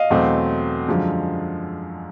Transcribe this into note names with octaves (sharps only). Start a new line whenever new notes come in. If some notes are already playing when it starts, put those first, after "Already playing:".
Already playing: D#5 F5
E2 B2 F#3 A3 C4
F#2 D3 F3 G#3